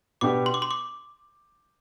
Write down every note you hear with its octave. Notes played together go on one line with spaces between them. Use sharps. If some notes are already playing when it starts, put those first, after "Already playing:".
B2 B3 D4 G4 D6
C6
D6
C6
D6